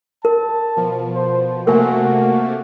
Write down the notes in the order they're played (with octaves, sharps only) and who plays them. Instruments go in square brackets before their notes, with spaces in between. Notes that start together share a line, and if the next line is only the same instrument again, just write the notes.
[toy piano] A#4 [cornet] A5
[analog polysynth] B2 F3
[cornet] C5
[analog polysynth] C3 A3 A#3 [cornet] F#4 [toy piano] A#4 G#5